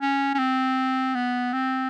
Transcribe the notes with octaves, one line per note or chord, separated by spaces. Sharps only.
C#4
C#4
C4
B3
C4